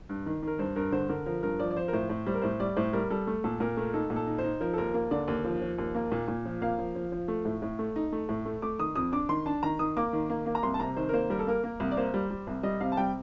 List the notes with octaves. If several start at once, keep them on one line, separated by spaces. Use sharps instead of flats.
G2
D#3
D#3 A#4
G2 C5
G2 A#4
D3 C5
D3 A#4
F3 A#4
G2 A#4
F3 D5
D5
F3 C5
A#4
A2 C5
A2
G3 C5
A#4
A2 C5
G3 D5
A2 C5
G3 A#4
G3 A4
A3
A#2 A4
A#2 A#4
A3 A#4
D#4 A4
A#2
A4
D#4
C5
D#4
F3 A#4
A4
D#2 A#4
A#3
D3 D5
D#2
F3
F3
D#2
A#3
A#2
A#2
F3
A#3 F5
F3
F3
F3
A3
A2
A2
A3
D#4
A3
A2
A3
A3 D6
D#3 D#6
F2 D#6
D4 D6
D#3 C6
D4 A5
D#3 A#5
D#3 D#6
A#3 D6
D#3
A#3
A#3
A#5
C2 C6
A5
C3 A#5
D#3 C5
A#4
A#3 C5
G3 A#4
A4
A#3 A#4
A#3
C2
D5
A#3 C5
G3
G3
C2
G3 D#5
C3 F5
A5
G3 G5